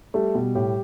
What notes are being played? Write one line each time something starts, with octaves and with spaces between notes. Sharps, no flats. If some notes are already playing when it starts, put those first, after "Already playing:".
G3 A3
B2 G3
A2 G4